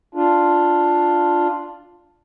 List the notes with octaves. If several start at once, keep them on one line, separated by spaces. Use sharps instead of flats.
D4 F4